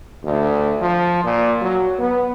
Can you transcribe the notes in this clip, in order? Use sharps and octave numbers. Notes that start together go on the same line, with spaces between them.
D2
F3
A#2
F#3
B3